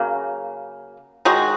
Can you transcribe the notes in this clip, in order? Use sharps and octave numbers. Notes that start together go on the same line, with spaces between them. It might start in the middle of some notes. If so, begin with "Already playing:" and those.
Already playing: C#3 F#3 A#3
D#3 G#3 F#4